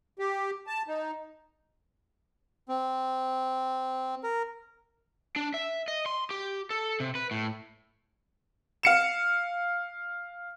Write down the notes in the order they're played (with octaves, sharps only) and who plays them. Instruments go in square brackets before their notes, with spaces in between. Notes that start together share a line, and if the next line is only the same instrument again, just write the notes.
[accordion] G4
A5
D#4
[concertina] C4
A#4
[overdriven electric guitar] D4
E5
D#5
C6
G4
A4
C3
B4
A2
[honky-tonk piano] F5 C#7 E7